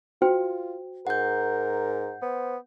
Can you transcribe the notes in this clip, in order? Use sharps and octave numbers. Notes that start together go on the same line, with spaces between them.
F4 F#4 C5 G5
G#2 A#4 F#5 G6
B3 C5